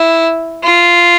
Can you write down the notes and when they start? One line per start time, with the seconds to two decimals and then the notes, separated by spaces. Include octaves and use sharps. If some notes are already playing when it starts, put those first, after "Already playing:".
Already playing: E4
0.63 F4